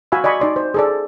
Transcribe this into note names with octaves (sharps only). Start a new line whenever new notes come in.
F#4 F5 G#5 B5 E6
D5 D#5 G#5 B5 C#6
D#4 D5 C6
C5
G#4 A4 D5